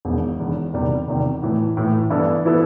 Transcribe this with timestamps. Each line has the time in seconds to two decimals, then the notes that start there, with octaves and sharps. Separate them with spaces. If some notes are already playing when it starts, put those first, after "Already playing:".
0.05 E1 E2 D#3
0.40 E1 E2 D#3
0.73 E2 C3 D#3 G3
1.08 E2 C3 D#3 G3
1.42 A2 E3 A3
1.77 A2 E3 A3
2.10 G2 E3 B3 E4 A4
2.45 E3 B3 E4 A4